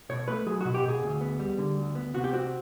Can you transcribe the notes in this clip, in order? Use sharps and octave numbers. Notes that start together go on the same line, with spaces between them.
B2 C#5
A3 B4
F#3 G#4
B2 F#4
G4
B2 G#4
D2
B3
G3
D3
D2
B3
C3 F#4
G4
C4 F#4